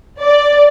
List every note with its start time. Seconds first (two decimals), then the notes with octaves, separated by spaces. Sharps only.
0.22 D5